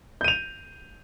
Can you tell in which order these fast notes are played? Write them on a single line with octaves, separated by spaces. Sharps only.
G6 D#7 F7